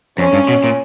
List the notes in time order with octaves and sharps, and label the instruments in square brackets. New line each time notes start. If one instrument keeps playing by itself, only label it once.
[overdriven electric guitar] F2 [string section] C#4
[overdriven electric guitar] G2
B2
A#2